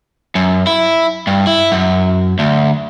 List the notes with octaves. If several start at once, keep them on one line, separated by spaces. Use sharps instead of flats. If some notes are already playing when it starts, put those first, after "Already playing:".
F#2
E4
G2
E4
F#2
D2